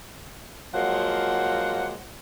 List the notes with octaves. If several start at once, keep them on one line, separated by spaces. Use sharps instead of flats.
F3 F#3 G#3 A#3 F#5